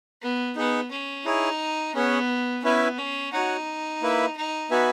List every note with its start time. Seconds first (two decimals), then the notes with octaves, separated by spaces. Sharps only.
0.22 B3
0.56 B3 D#4 G#4 B4 F#5
0.91 C#4
1.25 D#4 E4 G#4 C#5
1.94 B3 C#4 G#4 C#5 F#5
2.63 B3 C#4 E4 B4 E5 G#5
2.98 C#4
3.33 D#4 F#4 C#5 F#5
4.02 A#3 E4 B4 E5
4.37 D#4
4.70 B3 F#4 B4 E5 G#5